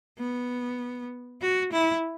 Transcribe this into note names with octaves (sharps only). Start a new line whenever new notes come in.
B3
F#4
E4